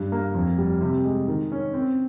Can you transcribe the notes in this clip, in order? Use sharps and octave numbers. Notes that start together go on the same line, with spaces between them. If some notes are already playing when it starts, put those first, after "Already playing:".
Already playing: G2
A#3
F2
G3
C3
G#3
D#3
C#4
C4